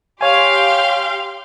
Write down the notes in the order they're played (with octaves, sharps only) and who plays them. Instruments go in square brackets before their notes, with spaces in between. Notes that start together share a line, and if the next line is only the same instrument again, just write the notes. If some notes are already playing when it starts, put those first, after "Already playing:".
[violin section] G4 F5 C6 [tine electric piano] C#5 G#5